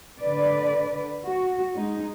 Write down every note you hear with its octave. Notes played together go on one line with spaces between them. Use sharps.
D3 B4 D5
F#4
G#3 D#4